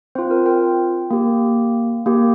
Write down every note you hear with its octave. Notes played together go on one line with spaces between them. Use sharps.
C4 F4 C5
A#4
G5
A#3 G4
A#3 G4